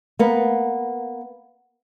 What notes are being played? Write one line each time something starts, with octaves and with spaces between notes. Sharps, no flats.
A#3 B3